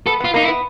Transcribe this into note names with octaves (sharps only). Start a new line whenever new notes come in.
B3 A4
B3 F4
A#3 D#4
E4
B3